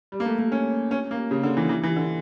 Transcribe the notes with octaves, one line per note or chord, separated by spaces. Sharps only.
G3
A#3
A3
A#3
C#4
C#4
A#3
C#3
D3
E3
E3
E3
D3